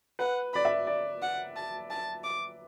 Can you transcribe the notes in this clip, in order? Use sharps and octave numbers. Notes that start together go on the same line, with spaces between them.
B4 F#5
D5 B5
E5
D5
F#5
A5
A5
D6